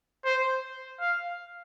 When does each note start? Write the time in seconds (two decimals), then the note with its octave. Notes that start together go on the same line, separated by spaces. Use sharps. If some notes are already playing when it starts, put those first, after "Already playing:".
0.25 C5
1.00 F5